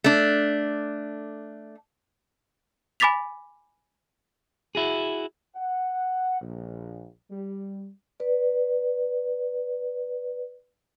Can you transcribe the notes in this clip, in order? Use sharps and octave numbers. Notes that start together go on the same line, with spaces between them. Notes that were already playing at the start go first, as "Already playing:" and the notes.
A3 D4
G#5 B5 D6 A6 B6 F7
E4 F#4 G#4
F#5
A#1
G3
B4 D5